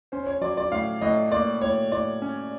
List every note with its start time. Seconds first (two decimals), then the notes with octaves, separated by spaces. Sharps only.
0.12 C#4 C5
0.22 C5
0.27 C#5
0.41 F#3 D5
0.57 D5
0.72 A2 F5
1.01 A2 D#5
1.31 A#3 D5
1.61 A2 C#5
1.92 A2 D5
2.22 C#4